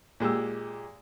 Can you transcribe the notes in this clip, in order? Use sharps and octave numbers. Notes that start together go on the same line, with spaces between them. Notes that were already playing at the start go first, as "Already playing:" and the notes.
A#2 G#3 G4 E6